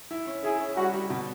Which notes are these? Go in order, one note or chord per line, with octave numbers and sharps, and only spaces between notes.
E4
C#4
E4 G#4
C#4
G3 F#4
G3
B2